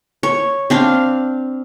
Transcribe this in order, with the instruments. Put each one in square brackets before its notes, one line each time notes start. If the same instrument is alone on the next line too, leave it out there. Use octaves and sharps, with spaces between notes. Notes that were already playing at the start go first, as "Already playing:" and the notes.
[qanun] C#5
C4 D4 F5